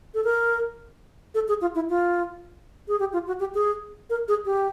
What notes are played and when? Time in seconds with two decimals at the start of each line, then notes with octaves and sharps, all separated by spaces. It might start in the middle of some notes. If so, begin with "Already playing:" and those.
0.14 A4
0.24 A#4
1.34 A4
1.48 G#4
1.61 F4
1.75 E4
1.90 F4
2.88 G#4
3.00 G4
3.13 F4
3.27 F#4
3.40 G4
3.55 G#4
4.10 A#4
4.28 G#4
4.45 G4